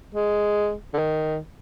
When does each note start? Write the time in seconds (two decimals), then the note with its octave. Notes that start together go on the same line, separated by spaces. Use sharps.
0.14 G#3
0.94 D3
0.98 D#3